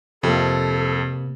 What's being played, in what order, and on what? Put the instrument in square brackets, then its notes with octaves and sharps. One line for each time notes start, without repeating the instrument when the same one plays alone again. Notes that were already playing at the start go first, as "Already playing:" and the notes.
[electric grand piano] F2 [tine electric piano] C3 A#3 [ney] A4